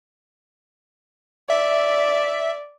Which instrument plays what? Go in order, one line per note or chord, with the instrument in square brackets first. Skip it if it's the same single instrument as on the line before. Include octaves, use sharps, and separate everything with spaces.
[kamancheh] D5 [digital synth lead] E5